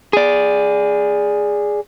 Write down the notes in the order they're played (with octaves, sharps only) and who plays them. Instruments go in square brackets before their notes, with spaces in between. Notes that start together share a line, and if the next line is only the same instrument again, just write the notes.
[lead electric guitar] G#4 D5